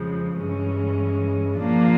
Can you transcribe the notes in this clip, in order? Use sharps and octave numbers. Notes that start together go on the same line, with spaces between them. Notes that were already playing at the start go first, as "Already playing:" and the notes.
Already playing: F2 C#3 F3 G#3
G2 E3 G#3 C#4
A#2 F3 A#3 D4 F4